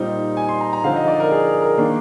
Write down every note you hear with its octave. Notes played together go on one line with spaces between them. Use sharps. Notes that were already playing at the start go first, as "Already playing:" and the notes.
Already playing: A#2 G3 C4 D#4
G#5
C6
A#5
A#5
D3 F3 C4 D#4 F5
D#5
D5
A#4
G#4
A#4
D#3 A#3 D4